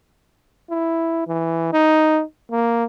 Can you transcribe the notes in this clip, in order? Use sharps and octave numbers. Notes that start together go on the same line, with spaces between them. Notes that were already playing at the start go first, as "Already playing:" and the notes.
E4
E3
D#4
A#3